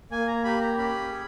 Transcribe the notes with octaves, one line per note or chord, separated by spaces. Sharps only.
A#3 G#5
A#5
G4 B5
A#5
C#4 B5
G#4